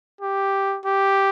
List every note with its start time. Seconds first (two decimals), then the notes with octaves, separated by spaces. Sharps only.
0.21 G4
0.86 G4